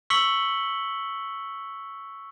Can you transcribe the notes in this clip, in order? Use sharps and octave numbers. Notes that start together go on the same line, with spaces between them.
C#6 E6 B6 C#7 F#7 G7